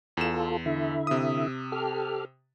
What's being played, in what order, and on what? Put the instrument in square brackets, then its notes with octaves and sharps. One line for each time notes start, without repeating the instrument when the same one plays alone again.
[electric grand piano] E2 E7 [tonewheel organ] F4 A4
[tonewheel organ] D3 E4 E5
[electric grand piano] C3 D#6
[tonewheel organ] G4 A4 F6